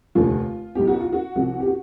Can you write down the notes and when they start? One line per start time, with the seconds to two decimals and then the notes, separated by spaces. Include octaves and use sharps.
0.15 F1 D#2 D3 F3 F4
0.75 B1 B2 G4
0.87 F#4
1.00 F4
1.12 F#4
1.35 C2 C3 F3 F#4
1.60 G4
1.66 F#4